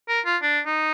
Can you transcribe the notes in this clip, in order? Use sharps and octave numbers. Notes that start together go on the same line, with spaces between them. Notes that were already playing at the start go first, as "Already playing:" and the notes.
A#4
F4
D4
D#4